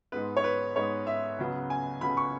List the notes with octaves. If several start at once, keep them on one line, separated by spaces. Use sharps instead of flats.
G#2 G#3 B3 B4
C#5
B4
G#2 G#3 B3 C#5
E5
C#2 C#3 F#3 B3
G#5
C#2 C#3 F#3 B3 B5
C#6